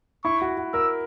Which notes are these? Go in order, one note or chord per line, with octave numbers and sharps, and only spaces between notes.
E4 C#6
F#4
F#4
A#4 E6